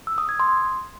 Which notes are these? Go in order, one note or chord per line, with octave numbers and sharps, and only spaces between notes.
E6
D#6
G#6
C6